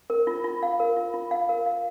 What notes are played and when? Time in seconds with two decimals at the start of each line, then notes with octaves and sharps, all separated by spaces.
0.10 A#4
0.27 F4
0.44 F4
0.63 F5
0.80 A#4
0.96 F4
1.14 F4
1.31 F5
1.49 A#4
1.66 F5